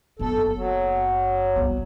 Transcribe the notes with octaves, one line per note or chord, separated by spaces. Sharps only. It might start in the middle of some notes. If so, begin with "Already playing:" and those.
F#1 B3 A4
F#3
C2 B3